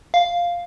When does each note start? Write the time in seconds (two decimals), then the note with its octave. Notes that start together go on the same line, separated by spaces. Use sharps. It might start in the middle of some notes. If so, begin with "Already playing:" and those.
0.14 F5